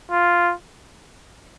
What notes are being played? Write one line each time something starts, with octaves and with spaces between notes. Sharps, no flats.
F4